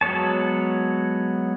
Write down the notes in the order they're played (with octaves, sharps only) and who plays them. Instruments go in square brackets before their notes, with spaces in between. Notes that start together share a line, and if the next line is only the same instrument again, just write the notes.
[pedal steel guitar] F#3 G#3 B3 C#5 A5